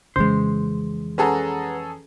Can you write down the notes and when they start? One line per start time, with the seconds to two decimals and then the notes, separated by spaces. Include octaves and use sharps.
0.16 F2 C#3 E3 G#3 C5
1.18 C#4 G#4 A4 B4 F#5 A#5